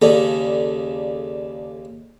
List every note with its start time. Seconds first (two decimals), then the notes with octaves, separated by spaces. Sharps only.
0.02 D#2 C#3 A4 D5